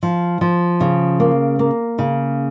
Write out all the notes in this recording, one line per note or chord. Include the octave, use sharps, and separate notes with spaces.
F3
F3
C#3
A#3
A#3
C#3